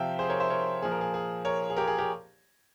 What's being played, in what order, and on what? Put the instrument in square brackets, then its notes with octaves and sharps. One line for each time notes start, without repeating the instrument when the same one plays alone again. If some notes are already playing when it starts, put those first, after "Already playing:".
Already playing: [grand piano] C3 F3 E5 F5 G5
G#4 C5
A#4 C#5
C5 E5
A#4 C#5
A#2 F3 G#4
A#4
G#4
G#4
A#4 C#5
G#4
G4 A#4
G#4
G4 A#4